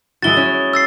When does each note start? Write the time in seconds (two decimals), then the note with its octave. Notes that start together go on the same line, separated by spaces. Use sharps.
0.22 G#3 E4 F#4 A6 G7
0.37 C#4
0.73 E6 A6 C7